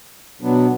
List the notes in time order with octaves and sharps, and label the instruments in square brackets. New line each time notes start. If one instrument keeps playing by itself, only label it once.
[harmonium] B2 F#3 B3 D4